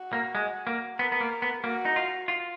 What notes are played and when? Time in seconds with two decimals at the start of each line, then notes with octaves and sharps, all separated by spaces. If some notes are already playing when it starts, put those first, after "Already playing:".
Already playing: F#4
0.13 A#3
0.35 G#3
0.67 A#3
0.99 B3 A#4
1.12 B3
1.21 A#3
1.42 B3
1.63 A#3 F#4
1.85 D#4
1.96 F4
2.28 F4